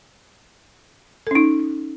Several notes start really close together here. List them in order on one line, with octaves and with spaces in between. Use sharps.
A4 C#4 D#4